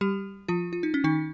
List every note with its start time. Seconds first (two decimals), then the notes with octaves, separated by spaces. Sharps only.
0.01 G3 G4
0.48 F3 F4
0.73 F4
0.83 D#4
0.94 C#4
1.04 D#3 D#4